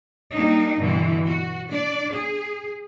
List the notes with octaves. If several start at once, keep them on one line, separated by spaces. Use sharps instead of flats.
G3 A#3 D4 D#4
G2 B2 D3 E3
F#4
D4 D5
G#4